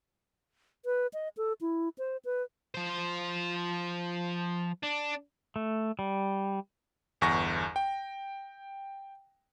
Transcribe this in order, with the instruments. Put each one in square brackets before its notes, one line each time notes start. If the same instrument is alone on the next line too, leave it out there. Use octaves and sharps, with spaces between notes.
[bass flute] B4
D#5
A4
E4
C5
B4
[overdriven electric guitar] F3 C5
D4
[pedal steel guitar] A3
G3
[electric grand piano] G1 E2 C#6 A#6
G5